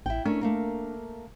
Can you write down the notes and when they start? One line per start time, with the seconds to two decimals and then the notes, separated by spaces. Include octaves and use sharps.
0.06 A1 E4 G5
0.25 A3 C#4 D4 A#4
0.41 A3 A#3 A#4